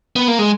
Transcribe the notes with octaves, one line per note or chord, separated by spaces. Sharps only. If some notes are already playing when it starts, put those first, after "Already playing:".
B3
A#3
G#3